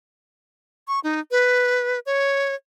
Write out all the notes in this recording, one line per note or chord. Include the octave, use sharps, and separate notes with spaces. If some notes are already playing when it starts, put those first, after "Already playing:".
C#6
D#4
B4
C#5